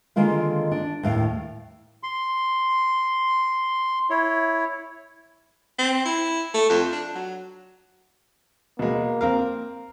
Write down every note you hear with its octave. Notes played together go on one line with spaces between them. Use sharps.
D3 D#3 G#3 A#3 F4 F5
D4
D#2 A2 F5
C6
E4 C#5
C4
E4
A3
F2
D4
F#3
B2 G#3 A#3
C4 A#4 F5